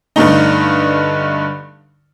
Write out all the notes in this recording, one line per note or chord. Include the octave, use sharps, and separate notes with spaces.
G2 D3 A3 D#4